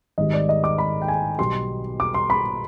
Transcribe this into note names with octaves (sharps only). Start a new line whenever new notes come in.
G#1 G#2 D#3 G3 D#5
D5
D#5
D6
B5
G5
G#5
B1 B2 G3 C6
D6
C6
B5